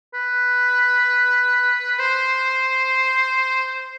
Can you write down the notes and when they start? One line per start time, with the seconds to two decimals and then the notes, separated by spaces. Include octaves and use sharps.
0.14 B4
1.99 C5